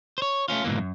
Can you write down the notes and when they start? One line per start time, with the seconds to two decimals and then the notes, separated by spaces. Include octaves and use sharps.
0.18 C5 C#5
0.48 A3 C4 C#4 F4
0.64 C#2 G#2 B2 E3 A#3
0.78 F#2